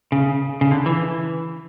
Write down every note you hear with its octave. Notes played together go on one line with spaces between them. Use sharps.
C#3
C#3
D3
E3